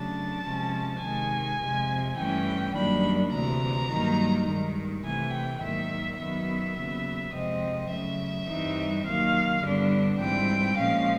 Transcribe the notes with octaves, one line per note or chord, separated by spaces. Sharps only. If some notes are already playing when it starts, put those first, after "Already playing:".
Already playing: C#3 F#3 A3 D4 A5
C3 F3 G#3 C#4
C3 D#3 G#3 G#5
F2 C3 F3 G#3
G2 E3 A3 C#4 G5
F#2 D#3 G3 A#3 D4 B5
D2 C3 E3 A#5
G2 D#3 F#3 A#3 D#4
G2 D#3 G#3
C3 E3 A3 G#5
G5
G#2 D#3 F#3 A#3 E5
F#2 D#3 F#3 B3 E5
D#2 C#3 F#3 B3
F2 C3 F3 G#3 C4 D#5
F#2 C#3 F#3 A3 E5
G2 E3 G3 C4 D#4
D#2 D#3 F#3 F5
G2 D3 G3 B3 D4
G#2 E3 G3 C4 G5
A#2 F3 G#3 C#4 F5